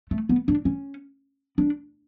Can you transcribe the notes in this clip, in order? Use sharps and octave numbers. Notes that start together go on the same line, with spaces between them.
A3
B3
D4
C#4
D4